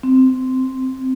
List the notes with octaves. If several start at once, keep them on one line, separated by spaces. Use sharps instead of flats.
C4